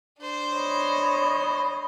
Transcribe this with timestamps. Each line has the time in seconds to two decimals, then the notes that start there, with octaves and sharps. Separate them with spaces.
0.18 D4 C5
0.55 C#5 D#5 B5